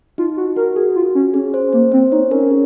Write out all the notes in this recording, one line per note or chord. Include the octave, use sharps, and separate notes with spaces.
D#4 F4
F#4
F#4 A#4
F#4 G#4
F4
C#4
C#4 G#4
C5
A#3 C5
C4 C5
D#4 C#5
C#4 A#4
G#4